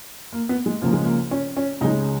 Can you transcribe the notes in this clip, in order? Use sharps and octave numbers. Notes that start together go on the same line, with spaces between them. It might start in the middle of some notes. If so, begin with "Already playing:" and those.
A#3
B3
G#3
C#2 C#3 F3 A#3
G#3
A#3
C#4
C#4
C#2 C#3 G#3 D#4